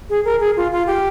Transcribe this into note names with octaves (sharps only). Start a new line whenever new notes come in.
G#4
A#4
G#4
F4
F4
G4